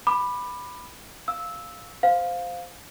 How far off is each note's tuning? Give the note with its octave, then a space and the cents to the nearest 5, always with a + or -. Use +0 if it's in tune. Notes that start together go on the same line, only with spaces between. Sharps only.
B5 +0 D6 +25
F5 +0 E6 -10
C5 -20 F5 +10